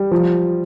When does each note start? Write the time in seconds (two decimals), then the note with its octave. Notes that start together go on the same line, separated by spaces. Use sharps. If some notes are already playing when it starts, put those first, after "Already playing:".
Already playing: G3
0.11 F3